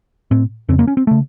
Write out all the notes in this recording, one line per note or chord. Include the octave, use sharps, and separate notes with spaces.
A2 C4
F2 C#3 C4
A#3
C#4
C4
C#3 A3